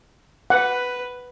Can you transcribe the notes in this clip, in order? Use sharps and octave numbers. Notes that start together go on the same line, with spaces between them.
B4 F#5